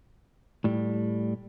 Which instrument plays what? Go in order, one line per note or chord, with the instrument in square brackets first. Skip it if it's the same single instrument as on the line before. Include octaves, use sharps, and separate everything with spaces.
[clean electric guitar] A2 G3